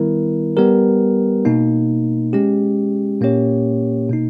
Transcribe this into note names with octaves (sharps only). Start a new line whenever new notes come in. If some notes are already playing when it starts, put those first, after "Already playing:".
Already playing: D#3 G3 B3 E4 A#4
G3 B3 G4 A#4
B2 A#3 D#4
G#3 C#4 G4
A#2 A#3 C#4 G4 C#5
B2 A#3 D#4